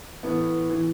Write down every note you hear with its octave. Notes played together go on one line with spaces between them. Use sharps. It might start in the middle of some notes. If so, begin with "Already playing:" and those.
A2 E3 B3
E3